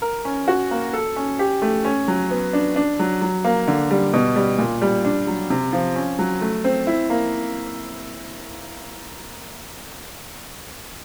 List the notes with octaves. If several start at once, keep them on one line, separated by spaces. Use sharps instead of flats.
A#4
C#4
F#4
A#3
A4
C#4
G4
A3
C#4
F#3
B3
D4
D4
F#3
F#3
A#3
D3
G3
B2
G3
A#2
G3
D4
F#3
C3
F3
C#4
F#3
A3
C4
E4
A#3